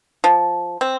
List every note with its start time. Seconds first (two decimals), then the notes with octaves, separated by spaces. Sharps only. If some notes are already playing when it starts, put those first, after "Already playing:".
0.24 F3
0.81 C4